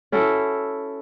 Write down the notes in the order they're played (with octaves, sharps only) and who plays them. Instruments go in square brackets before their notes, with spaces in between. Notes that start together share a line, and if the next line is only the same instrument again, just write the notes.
[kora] C#4 E4 F#4 A4